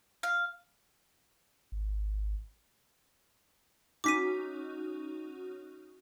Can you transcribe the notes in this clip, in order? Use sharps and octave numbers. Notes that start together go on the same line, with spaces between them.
F5
G#1
C#4 D#4 F#4 D6 B6 D#7